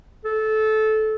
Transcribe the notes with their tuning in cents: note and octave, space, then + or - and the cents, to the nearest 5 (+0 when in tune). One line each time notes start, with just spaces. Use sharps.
A4 -20